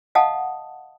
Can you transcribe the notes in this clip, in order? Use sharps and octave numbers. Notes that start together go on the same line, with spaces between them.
D#5 F5 F#5 A5 D#6